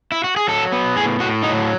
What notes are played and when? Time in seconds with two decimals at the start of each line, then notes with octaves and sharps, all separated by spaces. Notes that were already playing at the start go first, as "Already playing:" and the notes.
0.12 E4
0.24 F#4
0.37 G#4
0.48 F#3 A4
0.72 B3
0.96 A2 G#4
1.20 A2 F#4
1.43 F#3 D#4